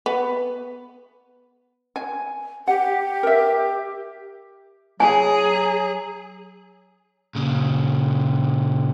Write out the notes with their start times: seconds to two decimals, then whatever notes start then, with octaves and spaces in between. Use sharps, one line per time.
0.06 B3
1.96 G#5
2.68 G4 F#5
3.23 A#4 E5
5.00 F#3 G#4 G#5
7.35 A#2 C#3